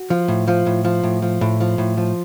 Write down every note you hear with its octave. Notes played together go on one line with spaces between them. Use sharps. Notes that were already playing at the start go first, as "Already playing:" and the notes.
Already playing: F#4
F3
A2
F3
A2
F3
A2
F3
A2
F3
A2
F3